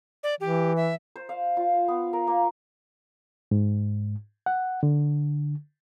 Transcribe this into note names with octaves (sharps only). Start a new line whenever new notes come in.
D5
E3 G4
E5
C5
F5
F4
B3
A#4
A#3
G#2
F#5
D3